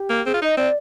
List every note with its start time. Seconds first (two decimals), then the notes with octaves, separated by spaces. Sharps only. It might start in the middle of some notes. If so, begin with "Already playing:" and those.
Already playing: G4
0.10 A#3
0.26 C4 G#4
0.34 F4
0.42 D#4 D#5
0.57 C4 D5